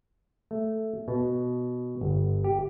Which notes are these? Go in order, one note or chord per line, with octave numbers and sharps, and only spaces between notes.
A3
B2
G1
G4